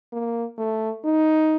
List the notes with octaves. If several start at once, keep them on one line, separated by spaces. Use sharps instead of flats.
A#3
A3
D#4